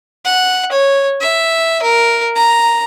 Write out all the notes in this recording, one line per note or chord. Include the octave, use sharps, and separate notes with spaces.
F#5
C#5
E5
A#4
A#5